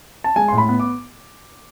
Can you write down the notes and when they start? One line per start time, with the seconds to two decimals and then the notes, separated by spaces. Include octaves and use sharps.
0.24 A5
0.36 G#3 G#5
0.48 A2 C6
0.58 B5
0.69 B3
0.80 D6